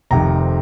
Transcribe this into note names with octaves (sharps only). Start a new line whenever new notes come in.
F1 F2 C3 D#3 A#5